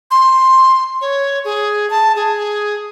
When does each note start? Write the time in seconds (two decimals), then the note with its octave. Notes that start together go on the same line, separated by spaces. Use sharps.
0.11 C6
1.01 C#5
1.45 G#4
1.90 A5
2.16 G#4